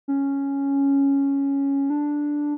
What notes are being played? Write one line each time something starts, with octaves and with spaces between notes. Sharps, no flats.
C#4
D4